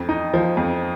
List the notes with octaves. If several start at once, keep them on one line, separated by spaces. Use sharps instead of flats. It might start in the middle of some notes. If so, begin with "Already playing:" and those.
Already playing: F2
D#4
F3
F2